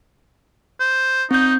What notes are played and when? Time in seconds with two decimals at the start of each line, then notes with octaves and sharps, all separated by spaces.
0.80 C5
1.31 C4 D#4 G6